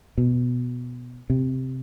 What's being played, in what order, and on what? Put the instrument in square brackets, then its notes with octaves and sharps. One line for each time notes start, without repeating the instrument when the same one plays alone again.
[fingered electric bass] B2
C3